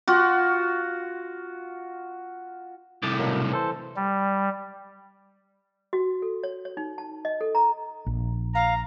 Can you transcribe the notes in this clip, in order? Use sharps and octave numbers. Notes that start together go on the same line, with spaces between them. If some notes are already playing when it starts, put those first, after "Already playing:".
F4 F#4
C2 A2 D6 D#6 A6
B2 F#3 A#3
E3 A4 C5
G3
F#4
A4
C#5
C#5
D#4
A5
D#5
A4
A#5
A#1
F5 A#5